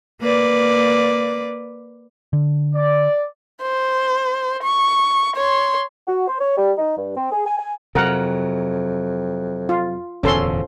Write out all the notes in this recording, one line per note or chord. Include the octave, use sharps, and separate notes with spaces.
A#3 B4 D5
D3
D5
C5
C#6
C#5 C6
F#4
C5
C#5
G3
D#4
G2
C4
G#4
G#5
G#5
F2 C3 F#3 A#4 F#5
F4
D1 E2 B2 F3 C#4 A4 C6